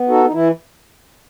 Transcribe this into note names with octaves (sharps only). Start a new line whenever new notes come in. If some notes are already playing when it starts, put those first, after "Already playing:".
Already playing: B3
D#4 F#4 A4
D#4
E3 E4